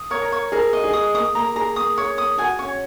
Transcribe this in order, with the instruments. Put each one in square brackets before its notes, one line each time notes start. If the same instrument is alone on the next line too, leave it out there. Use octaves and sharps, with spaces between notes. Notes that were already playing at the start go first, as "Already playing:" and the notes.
Already playing: [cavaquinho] D#6
[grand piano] A#4 [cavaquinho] C#5
[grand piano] A#4
[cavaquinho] C#5
[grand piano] G#4 [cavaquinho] A#4
[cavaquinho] D#5
[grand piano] G#4
[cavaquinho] D#6
[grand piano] A#3 [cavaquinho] D#6
[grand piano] A#3 [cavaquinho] A#5
[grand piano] G#4 [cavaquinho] A#5
[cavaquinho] D#6
C#5
D#6
[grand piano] F#4 [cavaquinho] G#5
[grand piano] C#4 [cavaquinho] C#5